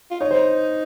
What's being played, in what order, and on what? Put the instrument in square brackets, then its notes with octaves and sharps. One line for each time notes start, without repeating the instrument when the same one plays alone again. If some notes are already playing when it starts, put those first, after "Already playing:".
[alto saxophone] F4
[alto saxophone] D#4 [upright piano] C#5
[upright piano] C5